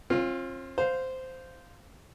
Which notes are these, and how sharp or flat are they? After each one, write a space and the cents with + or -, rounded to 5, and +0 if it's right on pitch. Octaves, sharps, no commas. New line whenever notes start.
C4 +45 F4 +0
C5 -10 F5 +0